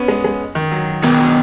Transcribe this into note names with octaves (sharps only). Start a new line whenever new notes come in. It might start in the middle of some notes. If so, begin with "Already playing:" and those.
Already playing: B3 C#4
G#3
G#3
D#3
F#3
B2 D#3 B3 G#4
F#3